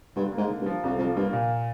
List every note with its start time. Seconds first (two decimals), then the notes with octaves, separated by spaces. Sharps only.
0.16 G2 D3
0.32 A#3
0.37 G#2
0.49 D3
0.61 G2
0.66 F3
0.83 C2 F2
0.98 F2 F3
1.16 G2 A#3
1.33 A#2